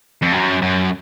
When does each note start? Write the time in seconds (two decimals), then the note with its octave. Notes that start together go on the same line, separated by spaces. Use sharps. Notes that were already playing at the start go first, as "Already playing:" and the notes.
0.22 F2
0.32 F#2
0.62 F#2